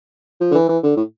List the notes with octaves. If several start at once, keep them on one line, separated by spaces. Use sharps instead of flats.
F3
D3
E3
E3
D3
A2